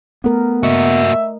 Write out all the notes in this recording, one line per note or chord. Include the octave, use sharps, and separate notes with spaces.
A3 B3 A#4
A#3 F#4 D#5 E5